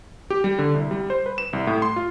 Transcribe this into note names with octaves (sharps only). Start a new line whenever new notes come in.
G4
G3
D3
C2
G3
C5
B4
E7
C2
A2
C6
F4